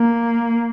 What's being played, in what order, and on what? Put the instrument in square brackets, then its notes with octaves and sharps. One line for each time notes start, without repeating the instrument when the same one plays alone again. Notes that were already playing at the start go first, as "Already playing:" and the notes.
Already playing: [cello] A#3